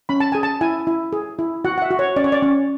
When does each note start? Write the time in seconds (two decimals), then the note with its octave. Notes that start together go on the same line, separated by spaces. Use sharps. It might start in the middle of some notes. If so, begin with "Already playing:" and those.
0.09 C#4 B5
0.20 A5
0.32 G#4 G#5
0.43 A5
0.61 E4 G#5
0.87 E4
1.13 G#4
1.39 E4
1.65 F#4 F#5
1.78 F#5
1.82 E5
1.91 F#4
1.99 C#5
2.16 C#4 D5
2.24 C#5
2.32 D5
2.42 C#4